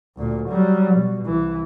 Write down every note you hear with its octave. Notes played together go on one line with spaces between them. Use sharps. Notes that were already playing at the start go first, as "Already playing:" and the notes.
D2 A#2
F#3 G3
B2
C2 E3